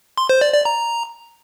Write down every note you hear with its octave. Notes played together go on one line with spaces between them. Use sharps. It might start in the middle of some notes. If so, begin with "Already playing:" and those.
C6
C5
D5
D5
A#5